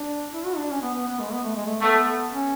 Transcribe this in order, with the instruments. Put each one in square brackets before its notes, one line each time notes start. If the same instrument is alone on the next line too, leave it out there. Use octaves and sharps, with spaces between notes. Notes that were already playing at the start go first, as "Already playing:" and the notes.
Already playing: [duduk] D4
E4
F#4
D4
C#4
B3
B3
B3
G#3
B3
A3
G#3
A3
[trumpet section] A3 [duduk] B3
[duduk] C#4